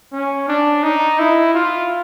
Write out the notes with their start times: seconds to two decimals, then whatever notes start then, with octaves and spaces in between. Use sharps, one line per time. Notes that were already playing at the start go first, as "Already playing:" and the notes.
0.12 C#4
0.48 D4
0.83 D#4
1.19 E4
1.55 F4